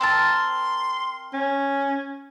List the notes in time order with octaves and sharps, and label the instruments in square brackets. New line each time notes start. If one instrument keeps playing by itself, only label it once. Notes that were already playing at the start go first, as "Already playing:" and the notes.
[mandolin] C4 A#4 A5 [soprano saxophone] C6
[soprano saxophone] C#4